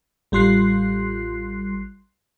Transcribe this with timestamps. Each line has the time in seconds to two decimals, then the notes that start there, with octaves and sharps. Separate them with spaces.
0.32 A1 G3 F4 C6 F#6 C7